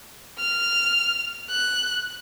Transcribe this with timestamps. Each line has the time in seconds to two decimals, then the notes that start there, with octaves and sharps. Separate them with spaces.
0.39 F6
1.51 F#6